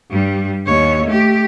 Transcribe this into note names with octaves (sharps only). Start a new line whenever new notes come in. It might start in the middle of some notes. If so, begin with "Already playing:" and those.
G2 G3
D#2 C#5
A3 G4